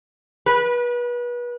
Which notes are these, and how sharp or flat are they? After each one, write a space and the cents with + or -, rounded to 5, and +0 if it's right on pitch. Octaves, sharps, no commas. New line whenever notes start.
B4 -30